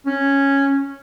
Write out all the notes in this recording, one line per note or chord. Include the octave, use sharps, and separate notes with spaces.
C#4